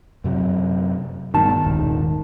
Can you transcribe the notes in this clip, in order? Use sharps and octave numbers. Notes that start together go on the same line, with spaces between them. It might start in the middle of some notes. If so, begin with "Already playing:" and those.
F#2 C3 F#3
G2 B2 D#3 A5
D#1 C2 G#2